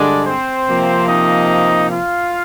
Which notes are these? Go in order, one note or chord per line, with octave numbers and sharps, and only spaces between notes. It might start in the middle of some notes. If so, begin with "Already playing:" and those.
Already playing: G2 D3 G#3 D4 D5
C4 C5
C3 F3 A#3
D#4 D#5
F4 F5